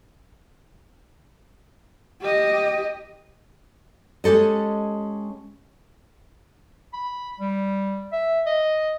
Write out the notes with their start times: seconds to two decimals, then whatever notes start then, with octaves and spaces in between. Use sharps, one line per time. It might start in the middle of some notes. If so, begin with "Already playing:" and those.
2.22 G4 D#5
4.24 G#3 C#4 G4 A4 D#5
6.94 B5
7.40 G3
8.12 E5
8.46 D#5